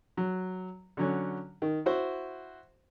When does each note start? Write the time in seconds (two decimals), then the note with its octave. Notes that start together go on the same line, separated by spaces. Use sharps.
0.17 F#3
0.97 D3 F#3 C#4
1.62 D#3
1.86 E4 F#4 C5